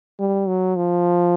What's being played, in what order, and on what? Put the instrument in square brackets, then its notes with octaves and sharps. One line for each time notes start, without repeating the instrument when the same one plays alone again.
[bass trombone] G3
F#3
F3